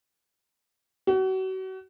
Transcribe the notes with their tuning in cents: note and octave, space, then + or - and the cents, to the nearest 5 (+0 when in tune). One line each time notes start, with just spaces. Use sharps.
F#4 +35